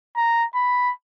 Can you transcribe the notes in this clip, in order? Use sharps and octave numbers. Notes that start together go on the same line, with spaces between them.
A#5
B5